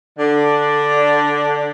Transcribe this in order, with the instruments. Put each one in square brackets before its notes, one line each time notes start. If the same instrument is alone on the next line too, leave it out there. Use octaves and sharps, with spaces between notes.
[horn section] D3 D4